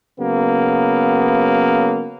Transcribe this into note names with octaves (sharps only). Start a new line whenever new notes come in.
C#3 F#3 A#3 B3